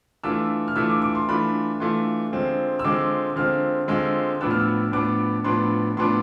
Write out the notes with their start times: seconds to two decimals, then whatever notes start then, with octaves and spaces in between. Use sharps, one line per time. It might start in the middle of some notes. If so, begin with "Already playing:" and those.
0.24 E3 A3 D4 F4 E6
0.68 F6
0.76 E3 A3 D4 F4 E6
0.90 D6
1.02 D6
1.15 C6
1.28 E3 A3 D4 F4 B5
1.80 E3 A3 D4 F4 C6
2.32 D3 G#3 C4 F4
2.79 E6
2.84 D3 G#3 C4 F4 D6
3.36 D3 G#3 C4 F4 F6
3.88 D3 G#3 C4 F4 E6
4.41 A2 F3 B3 D4 E6
4.51 F6
4.60 E6
4.92 A2 F3 B3 D4 D6
5.44 A2 F3 B3 D4 C6
5.97 A2 F3 B3 D4 C6